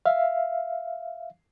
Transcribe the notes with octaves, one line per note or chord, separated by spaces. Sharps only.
E5 F5